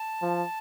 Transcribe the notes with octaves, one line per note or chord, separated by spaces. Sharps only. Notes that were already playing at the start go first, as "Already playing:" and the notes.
Already playing: A5
F3